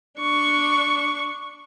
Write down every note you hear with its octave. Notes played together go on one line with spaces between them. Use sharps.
D4 C#6